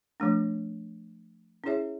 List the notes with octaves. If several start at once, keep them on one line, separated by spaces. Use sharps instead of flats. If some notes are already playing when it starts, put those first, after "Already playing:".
F3 A3 D4
C#4 E4 G#4 C#5 E5